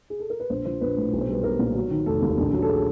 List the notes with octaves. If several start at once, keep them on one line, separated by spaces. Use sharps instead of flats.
G#4
A4
A#4
B4
A#1 C5
F3 C5
A#1 B4
A2
B1
C5
G3 B4
B1 A#4
A#2
F#3
D#3
F1 A4
D#2
A#1
F#3
A4
G#4